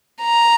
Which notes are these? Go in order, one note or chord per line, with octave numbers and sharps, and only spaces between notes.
A#5